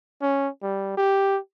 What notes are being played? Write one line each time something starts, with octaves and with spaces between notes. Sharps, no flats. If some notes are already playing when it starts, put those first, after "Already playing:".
C#4
G3
G4